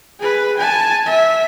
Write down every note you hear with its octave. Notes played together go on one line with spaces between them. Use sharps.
G#4 B4
G#5 A5
E5